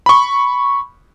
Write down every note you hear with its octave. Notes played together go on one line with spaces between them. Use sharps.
B5 C#6